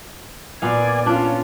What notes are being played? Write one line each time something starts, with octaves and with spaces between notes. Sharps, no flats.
A#2 B3 D5 F5 G#5
C#4 D4 F4